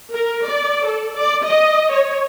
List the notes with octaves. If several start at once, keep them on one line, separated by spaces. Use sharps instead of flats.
A#4
D5
A4
D5
D#5
C#5